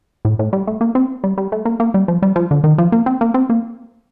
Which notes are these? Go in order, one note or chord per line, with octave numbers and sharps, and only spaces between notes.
A2
A2
G3
A3
A#3
C4
G3
G3
A3
A#3
A#3
G3
F3
G3
F3
D3
D#3
F3
A#3
C4
A#3
C4
A#3